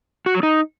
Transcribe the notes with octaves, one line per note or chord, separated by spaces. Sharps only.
F#4
F#3
D#4